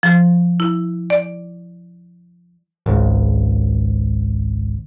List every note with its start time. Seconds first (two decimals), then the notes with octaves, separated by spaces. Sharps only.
0.03 F3
0.60 E4
1.10 D5
2.86 G#1 C#2